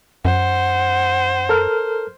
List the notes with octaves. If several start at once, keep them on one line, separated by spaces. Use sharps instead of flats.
F#2 C5 F#5
A4 A#4 F6